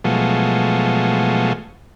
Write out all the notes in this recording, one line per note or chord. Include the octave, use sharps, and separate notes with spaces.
B2 F3 F#3 G#3 A3